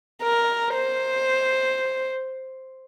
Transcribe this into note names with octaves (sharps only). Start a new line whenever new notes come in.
A#4
C5